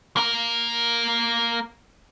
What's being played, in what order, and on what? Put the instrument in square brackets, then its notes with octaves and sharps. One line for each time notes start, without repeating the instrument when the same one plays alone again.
[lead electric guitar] A#3 A#4